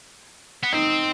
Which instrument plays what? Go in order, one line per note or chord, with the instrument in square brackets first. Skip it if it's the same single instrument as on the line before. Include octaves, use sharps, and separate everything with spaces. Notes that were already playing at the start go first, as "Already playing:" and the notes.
[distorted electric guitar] B3
[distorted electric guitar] C4 [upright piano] D#4